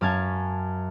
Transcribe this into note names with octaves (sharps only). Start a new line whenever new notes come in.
F#2 C#4 F5 A5 G#6